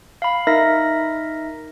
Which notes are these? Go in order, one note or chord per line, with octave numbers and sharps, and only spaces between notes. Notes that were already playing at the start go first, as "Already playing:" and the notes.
F5 B5
D#4 A#4 E5 A#6